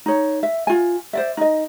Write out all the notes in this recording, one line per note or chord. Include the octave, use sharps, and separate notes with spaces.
D#4 C#5
E5
F4 G#5
C5 D5 E5
D#4 D#5